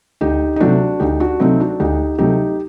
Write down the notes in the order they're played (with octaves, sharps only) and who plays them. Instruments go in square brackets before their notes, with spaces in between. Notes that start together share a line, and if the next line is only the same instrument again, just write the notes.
[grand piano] D2 [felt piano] D#4 G4
[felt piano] D#4
[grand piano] C3 F#3 A3 [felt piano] D4 F#4
[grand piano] D2 [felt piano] D#4 G4
[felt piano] D4 F#4
[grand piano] C3 F#3 A3 [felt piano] C4 D#4
[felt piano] D4 F#4
[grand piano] D2 [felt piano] D#4 G4
[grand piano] C3 F#3 A3 [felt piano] D#4 G4